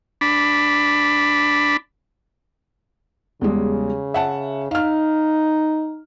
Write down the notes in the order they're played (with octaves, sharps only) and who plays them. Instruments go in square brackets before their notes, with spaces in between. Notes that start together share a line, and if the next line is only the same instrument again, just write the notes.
[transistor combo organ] D4 B5
[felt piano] E2 G3 G#3 [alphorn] C#3
[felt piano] E5 F#5 A5
[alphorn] D#4 [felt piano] F5 F6